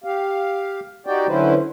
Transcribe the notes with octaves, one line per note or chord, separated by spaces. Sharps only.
G4 F5
D#4 F#4 G4 D5 G5
D3 F#3 C#4 E4 B4 C5